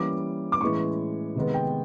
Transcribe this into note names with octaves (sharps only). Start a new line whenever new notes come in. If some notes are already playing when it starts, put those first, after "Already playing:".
Already playing: E3 G3 A#3 C#4 D6
D6
A2 E3 G#3 C#4 C#6
C3 D#3 G#3 B3
G5